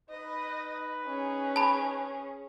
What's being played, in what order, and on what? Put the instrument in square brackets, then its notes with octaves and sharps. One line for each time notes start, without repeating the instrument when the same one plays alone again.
[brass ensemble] D#4 B4 [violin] D#5
[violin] C#4 G#4
[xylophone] A5 B5